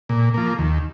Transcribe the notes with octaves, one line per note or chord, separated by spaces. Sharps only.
A#2
F3 A#3
D#2